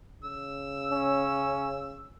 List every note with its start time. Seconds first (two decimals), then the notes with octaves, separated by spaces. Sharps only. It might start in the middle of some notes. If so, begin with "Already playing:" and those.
0.23 C#3 E6
0.91 C#4